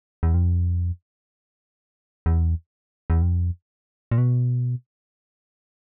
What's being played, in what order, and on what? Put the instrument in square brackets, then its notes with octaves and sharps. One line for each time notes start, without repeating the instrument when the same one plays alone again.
[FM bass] E2
F2
E2
E2
F2
A#2
B2